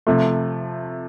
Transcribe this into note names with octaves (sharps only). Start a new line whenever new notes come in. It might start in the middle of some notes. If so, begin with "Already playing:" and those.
C3 F3 A3